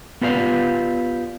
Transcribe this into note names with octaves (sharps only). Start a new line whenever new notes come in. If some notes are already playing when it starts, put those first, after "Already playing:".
B3 F4 G4 B4 D5 F5